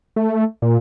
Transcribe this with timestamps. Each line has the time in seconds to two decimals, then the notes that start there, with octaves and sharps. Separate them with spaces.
0.16 A3
0.62 A#2